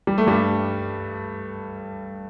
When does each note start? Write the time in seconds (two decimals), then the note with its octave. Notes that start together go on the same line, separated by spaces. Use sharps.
0.07 G3
0.18 A3
0.27 G2 G3